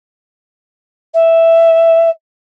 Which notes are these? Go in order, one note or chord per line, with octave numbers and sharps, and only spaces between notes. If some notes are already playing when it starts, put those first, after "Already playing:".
E5